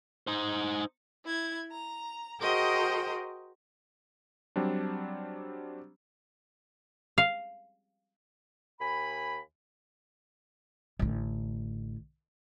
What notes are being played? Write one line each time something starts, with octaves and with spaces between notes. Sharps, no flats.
D#4 C5
E4 G#6
A#5
F#4 G#4 A#4 C5 D#5 G5
F#3 G3 C4 D4
F5
D#2 G#5 B5
A1 D3